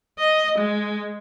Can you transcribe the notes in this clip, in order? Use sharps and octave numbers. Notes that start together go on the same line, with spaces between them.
D#5
G#3